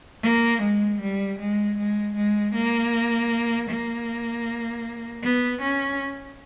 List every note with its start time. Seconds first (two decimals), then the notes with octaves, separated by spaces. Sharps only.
0.23 A#3
0.62 G#3
1.01 G3
1.39 G#3
1.78 G#3
2.16 G#3
2.55 A#3
3.71 A#3
5.23 B3
5.62 C#4